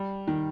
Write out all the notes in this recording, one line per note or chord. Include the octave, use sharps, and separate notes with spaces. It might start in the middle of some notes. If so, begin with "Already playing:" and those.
Already playing: G3
D#3